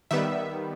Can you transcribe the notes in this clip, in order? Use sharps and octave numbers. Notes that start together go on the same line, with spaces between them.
D#3 G3 B3 E5